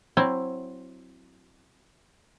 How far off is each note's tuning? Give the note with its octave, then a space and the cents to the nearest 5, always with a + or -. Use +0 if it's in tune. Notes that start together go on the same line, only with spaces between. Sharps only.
F#3 +0 C4 +10 E4 +10